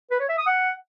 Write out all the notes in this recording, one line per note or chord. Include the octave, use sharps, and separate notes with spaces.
B4
C#5
E5
D#6
F#5